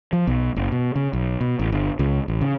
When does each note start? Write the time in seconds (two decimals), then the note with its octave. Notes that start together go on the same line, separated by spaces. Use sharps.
0.13 F3
0.27 B1
0.56 F#1
0.72 B2
0.96 C#3
1.13 B1
1.41 B2
1.59 A1
1.72 G1
1.99 C#2
2.28 A1
2.41 C#3